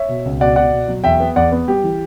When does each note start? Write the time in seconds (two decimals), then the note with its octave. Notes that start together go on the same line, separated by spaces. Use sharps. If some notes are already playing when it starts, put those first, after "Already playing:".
Already playing: C#5 E5
0.09 B2
0.25 C#2
0.40 B2 D5 F#5
0.56 B2 D5 F#5
0.72 B2
0.88 F#3
1.04 E2 E5 G5
1.20 B3
1.36 E2 D5 F#5
1.52 B3
1.68 G3 G4
1.84 E3